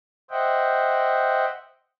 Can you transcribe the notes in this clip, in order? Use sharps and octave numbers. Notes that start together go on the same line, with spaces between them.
C5 D#5 E5 F#5 G5